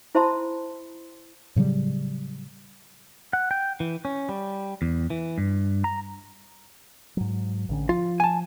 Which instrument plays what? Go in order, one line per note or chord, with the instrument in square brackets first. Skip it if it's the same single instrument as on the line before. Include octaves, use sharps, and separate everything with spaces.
[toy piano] E4 C5 E5 A5 B5 C6
[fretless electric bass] A2 C#3 F#3 G3
[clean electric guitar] F#5
G5
E3
C#4
G3
E2
E3
G2
A#5
[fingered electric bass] G#2 F#3
A1 D3 C#4
[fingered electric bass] F3 [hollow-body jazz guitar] F4
[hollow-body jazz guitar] G#5 A5